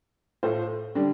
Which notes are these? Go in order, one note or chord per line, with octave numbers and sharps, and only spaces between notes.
A2 A3 F4 C5
D3 G3 D4